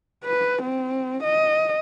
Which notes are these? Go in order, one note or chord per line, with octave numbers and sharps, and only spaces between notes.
B4
C4
D#5